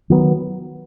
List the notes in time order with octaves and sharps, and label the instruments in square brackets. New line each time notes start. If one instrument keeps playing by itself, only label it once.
[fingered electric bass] D#3 F#3 B3